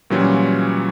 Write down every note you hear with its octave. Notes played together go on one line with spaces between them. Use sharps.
A#2 E3 F#3 G3 C#4 F4